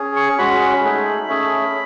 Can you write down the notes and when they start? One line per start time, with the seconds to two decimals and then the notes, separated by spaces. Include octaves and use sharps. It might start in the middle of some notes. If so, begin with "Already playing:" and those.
Already playing: C#4 G#4
0.16 C#6
0.38 G#3 C#4 F#4 B5
0.83 A3 D#4 G#4
1.28 A3 C#4 G#4